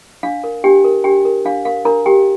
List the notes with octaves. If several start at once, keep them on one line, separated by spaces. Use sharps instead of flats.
D4 F5
A#4
D4 G4 G5
A#4
D4 G4 G5
A#4
D4 F5
A#4 F5
D4 A#4 A#5
G4 A#4 G5